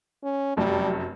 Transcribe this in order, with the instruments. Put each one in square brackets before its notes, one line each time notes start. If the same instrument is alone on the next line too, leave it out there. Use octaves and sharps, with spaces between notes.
[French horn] C#4
[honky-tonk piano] F1 F#2 A3 [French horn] G3